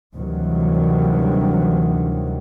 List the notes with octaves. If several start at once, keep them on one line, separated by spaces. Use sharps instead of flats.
D2 C3 D#3 E3 F#3 G3